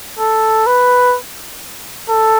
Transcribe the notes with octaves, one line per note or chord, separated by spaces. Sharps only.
A4
B4
A4